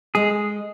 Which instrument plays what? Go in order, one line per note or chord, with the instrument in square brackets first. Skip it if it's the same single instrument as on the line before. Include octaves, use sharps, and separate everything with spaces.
[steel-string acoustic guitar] G#3 [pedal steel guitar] G#4